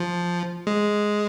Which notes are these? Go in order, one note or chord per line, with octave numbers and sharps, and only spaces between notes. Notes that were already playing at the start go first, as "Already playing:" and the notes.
Already playing: F3
G#3